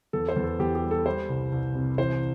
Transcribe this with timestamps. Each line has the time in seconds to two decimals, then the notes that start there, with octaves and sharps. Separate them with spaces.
0.13 E2 A4
0.29 C5
0.36 E2
0.44 A4
0.59 E2 G4
0.75 G4
0.82 G3
0.91 A4
1.06 G3 C5
1.29 C2
1.52 C2
1.75 C3
1.98 E3 C5